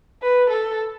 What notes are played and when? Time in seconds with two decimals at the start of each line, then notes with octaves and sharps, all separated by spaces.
0.22 B4
0.50 A4